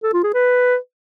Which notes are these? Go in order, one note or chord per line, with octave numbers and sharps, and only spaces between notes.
A4
F4
G#4
B4